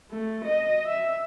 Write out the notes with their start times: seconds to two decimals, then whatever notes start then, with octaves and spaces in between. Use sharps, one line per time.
0.11 A3
0.45 D#5
0.86 E5